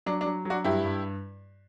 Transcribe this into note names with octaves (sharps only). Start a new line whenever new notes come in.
F#3 D4
D4
F#3
F#3 D4 F#4
G2 E4 G4
G2